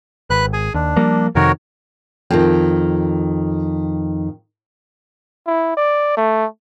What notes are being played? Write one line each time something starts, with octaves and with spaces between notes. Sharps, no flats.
G#1 B4 F#6
G#4 G#5
D#2 D4
F3 G3 A#3
F2 C3 D#3 F#4 A#4 C#5
F2 D#3
E4
D5
A3